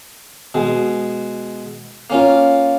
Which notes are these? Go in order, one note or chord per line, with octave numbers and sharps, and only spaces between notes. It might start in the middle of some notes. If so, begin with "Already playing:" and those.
B2 G#3
A#3 C#4 F4